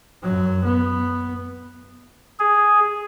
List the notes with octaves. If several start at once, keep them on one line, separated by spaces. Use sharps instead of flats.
F#2 F#3
B3
G#4